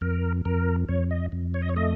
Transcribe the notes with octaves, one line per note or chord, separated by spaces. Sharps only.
F2 A#4
F2 A#4
F2 C#5
D#5
F2
C#5
D#5
C#5
A3 D#5